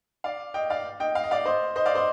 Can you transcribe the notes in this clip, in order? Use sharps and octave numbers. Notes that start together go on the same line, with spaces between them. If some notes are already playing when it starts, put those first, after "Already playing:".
D5 F5
D#5 G5
D5 F5
D#5 G5
F5
D#5
D5 F5
C5 D#5
C5 D#5
D5 F5
C5 D#5